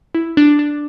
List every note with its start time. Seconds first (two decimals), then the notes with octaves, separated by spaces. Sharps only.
0.15 E4
0.37 D4
0.59 D4